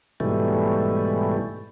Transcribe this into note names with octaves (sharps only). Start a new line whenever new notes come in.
G#2 B2 E3 G3 A3